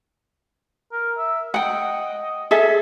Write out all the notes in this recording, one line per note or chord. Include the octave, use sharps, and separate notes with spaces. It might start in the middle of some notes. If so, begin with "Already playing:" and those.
A#4
E5
D#5 F#5 G5
G#4 A4 E5